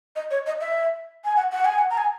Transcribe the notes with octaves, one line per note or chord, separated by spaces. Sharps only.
D#5
C#5
D#5
E5
G#5
F#5
F#5
G#5
F#5
A#5
G#5